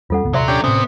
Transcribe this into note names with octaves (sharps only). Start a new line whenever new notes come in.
E2 G3 C#4 F4 A4 F#5
G1 C#2 B3
D#1 F#2 C3 F#3 D5 E5 C6
C#4 D4 G4
A2 C3 B3 C#4